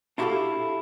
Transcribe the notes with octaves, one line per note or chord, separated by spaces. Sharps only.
D4 E4 F#4 G4 A4 F5